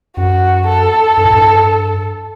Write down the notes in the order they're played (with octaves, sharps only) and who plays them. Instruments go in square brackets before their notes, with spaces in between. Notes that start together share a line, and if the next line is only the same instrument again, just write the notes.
[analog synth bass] F#2 [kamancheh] F#4
[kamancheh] A4
[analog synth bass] G2
A2
G2